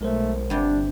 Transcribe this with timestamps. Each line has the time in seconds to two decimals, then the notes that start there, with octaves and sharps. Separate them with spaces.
0.01 B1 G#3 A3 A#4 C5
0.50 G1 G2 C3 D4